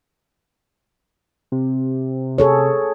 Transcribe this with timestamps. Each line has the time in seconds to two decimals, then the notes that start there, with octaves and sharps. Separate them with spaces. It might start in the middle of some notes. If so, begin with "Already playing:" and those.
1.52 C3
2.38 G#4 A4 C#5